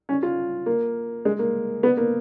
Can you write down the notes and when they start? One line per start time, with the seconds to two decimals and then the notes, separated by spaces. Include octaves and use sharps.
0.09 C#4
0.23 F4
0.66 A#3
1.25 G#3
1.39 A#3
1.83 B3
1.97 A#3